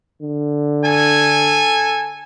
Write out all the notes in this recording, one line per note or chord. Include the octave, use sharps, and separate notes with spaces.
D3
A4 G#5